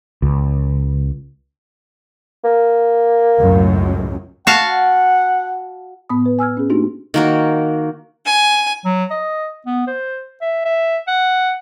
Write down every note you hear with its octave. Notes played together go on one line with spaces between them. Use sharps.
C#2
A#3
C#2 F#2 A2
F#4 F5 F#5 A5
A2 B3 B5 D#6
B4
G#5 E6 F6 G#6
C#4 G#4
A3 A#3 D4 D#4 F#4 G4
D#3 A#3 F#4
G#5
F#3
D#5
B3
C5
E5
E5
F#5